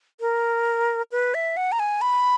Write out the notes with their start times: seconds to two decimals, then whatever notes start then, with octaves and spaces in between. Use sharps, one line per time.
0.20 A#4
1.12 B4
1.34 E5
1.57 F#5
1.72 A#5
1.79 G#5
2.01 B5